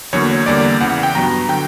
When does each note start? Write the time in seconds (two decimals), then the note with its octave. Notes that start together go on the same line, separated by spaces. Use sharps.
0.13 E2 D3 F#3 A#3 C#5
0.46 E2 D3 G3 A#3 D5
0.81 E2 C#3 E3 F#5
1.03 G5
1.15 G2 F#3 B3 A#5
1.48 D3 F#3 G5